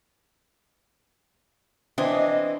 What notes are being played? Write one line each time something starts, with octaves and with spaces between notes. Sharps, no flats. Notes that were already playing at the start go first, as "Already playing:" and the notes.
E3 C4 D4 D#5